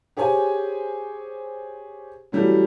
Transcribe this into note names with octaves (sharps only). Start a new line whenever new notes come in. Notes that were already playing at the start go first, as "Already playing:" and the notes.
G4 G#4 C5 C#5 G#5
E3 F#3 G3 A3 C#4